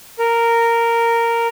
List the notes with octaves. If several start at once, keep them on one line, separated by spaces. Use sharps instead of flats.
A#4